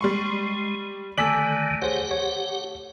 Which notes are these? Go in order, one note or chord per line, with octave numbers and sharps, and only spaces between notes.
G3 G#3 C6 C#6
D3 D#3 A3 D5 G#5 E6 B6 F#7
G4 G#4 C5 C#5 F#5
C#5